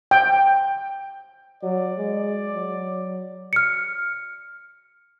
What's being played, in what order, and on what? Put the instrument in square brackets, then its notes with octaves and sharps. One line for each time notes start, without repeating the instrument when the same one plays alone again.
[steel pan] G5
[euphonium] F#3 [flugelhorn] D5
[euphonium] G#3
F#3
[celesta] F6 C#7